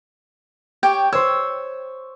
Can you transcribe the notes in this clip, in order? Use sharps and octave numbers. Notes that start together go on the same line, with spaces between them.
G4 C#5 G5
C5 C#5 E6